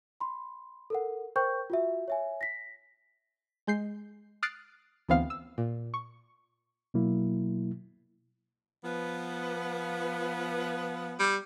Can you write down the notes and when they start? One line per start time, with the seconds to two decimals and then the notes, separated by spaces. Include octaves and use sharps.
0.20 B5 C6
0.90 A4 A#4 F#5
1.36 A#4 C5 G5 C#6 G6
1.70 F4 F#4 E5
2.08 C#5 E5 G#5
2.41 A#6 B6
3.67 G#3 G6 C7
4.43 D#6 F6 F#6 A6 C7 D7
5.09 D2 E3 B3 C4 F5 F6
5.30 E6
5.58 A#2
5.94 C#6
6.94 B2 F#3 A#3 E4
8.84 F3 B3
11.19 G3